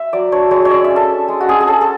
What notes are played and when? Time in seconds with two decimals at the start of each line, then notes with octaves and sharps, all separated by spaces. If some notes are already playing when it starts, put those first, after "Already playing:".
Already playing: E5
0.13 F#3 D5
0.32 D4 C#5
0.51 G#3 C#5
0.65 C#5
0.71 C#4 D5
0.84 E5
0.90 C#4
0.96 A4
1.10 D4
1.28 G#3
1.41 F#4
1.49 C#4 G#4
1.60 G#4
1.68 C#4 A4
1.81 A4